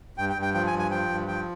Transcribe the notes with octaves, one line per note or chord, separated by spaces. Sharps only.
G2 G5
G5
G2
G5
F3 G5
G#5
G2
G#5
F3 G5
G2
F3 G5